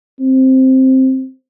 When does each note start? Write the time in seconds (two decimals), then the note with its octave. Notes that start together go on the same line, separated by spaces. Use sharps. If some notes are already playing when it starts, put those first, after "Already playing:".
0.20 C4